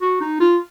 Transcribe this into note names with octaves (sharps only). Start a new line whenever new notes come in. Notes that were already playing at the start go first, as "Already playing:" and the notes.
F#4
D#4
F4